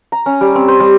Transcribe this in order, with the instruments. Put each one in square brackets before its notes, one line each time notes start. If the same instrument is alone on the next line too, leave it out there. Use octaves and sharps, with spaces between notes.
[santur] A#5
C#4
G3
C4
C5
G3